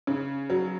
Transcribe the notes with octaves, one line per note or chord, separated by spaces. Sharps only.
C#3
F#3